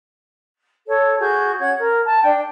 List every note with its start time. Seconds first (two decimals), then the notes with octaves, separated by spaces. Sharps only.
0.87 A4 C#5
1.19 F#4 G#4 C#6 G6
1.59 C#4 C#5 F#5 G#6
1.78 A#4
2.06 A5
2.22 D4 G5